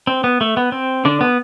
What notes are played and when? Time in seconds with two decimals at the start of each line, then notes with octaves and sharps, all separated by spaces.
0.07 C4
0.24 B3
0.41 A3
0.57 B3
0.72 C4
1.05 D3 D4
1.21 B3